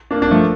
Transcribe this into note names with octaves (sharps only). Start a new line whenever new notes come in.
A#3 D4
A#3 D4
F3 A3